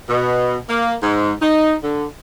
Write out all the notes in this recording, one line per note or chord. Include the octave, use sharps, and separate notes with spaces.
B2
A#3
G#2
D#4
D3